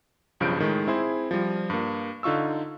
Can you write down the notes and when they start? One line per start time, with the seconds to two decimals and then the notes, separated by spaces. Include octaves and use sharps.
0.40 B1 G2 C#3 F3 G6 D7
0.58 A2 D#3 G#3
0.87 C4 E4 G#4 C5
1.31 F3 G3
1.70 G2 A#3
2.23 D3 D#4 F4 C#6 E6